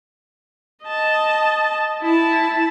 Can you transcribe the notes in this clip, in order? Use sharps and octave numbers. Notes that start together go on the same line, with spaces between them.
D#5 A5
E4 A5